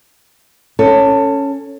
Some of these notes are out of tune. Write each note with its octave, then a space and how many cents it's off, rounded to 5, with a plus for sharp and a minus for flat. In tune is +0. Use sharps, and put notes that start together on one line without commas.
C#4 +0 A4 +20